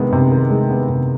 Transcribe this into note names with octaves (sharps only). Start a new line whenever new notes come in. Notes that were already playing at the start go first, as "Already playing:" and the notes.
Already playing: C3 D#3 G#3 B3
C3
D#3
G#3
B3
C3